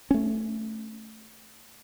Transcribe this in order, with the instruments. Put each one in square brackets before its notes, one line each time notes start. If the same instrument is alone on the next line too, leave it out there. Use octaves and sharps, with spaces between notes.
[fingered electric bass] A3 C#4